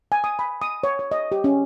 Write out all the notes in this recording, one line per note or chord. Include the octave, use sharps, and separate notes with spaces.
G#5
D#6
B5
D#6
C#5
C#5
D#5
G4
C#4